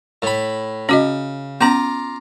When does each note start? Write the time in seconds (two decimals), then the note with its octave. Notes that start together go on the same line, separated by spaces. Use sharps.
0.22 A2 B5
0.89 C#3 C#4 F#4 D#5
1.61 B3 C#4 F4 A#5 D6